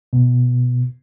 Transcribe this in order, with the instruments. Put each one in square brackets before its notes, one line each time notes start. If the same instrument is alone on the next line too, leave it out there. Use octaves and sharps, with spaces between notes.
[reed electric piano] B2